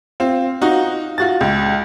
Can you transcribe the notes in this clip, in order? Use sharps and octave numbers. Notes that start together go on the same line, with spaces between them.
C4 F4
D#4 F4 F#4
F4 F#4 A6
C#2